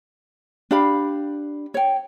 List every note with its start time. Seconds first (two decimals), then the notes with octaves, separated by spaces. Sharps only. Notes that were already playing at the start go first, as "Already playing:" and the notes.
0.71 D4 G4 F5 B5
1.74 C#5 G5